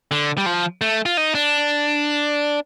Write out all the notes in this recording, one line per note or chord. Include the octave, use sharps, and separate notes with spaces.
D3
G3
F3
A3
F4
D#4
D4